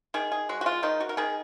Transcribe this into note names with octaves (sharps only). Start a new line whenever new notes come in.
D#3 G#4
G#4
G#3 F#4
F#4
F4
D#3 D#4
F#4
A#4
D#3 G#4